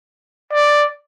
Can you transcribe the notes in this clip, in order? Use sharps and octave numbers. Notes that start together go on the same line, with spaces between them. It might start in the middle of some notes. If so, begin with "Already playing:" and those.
D5